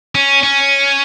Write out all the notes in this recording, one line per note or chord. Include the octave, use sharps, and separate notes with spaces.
C#4
C#4